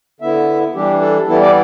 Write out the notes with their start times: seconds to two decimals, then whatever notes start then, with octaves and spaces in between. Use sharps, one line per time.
0.21 D3 B3 E4 E5
0.74 E3 G3 D4 G4
1.01 A4
1.27 E3 G3 B3 E4 A4
1.41 D5